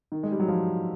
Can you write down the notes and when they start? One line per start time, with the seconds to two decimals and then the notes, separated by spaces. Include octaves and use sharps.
0.12 D#3
0.23 G#3
0.32 G3
0.40 F#3
0.48 F3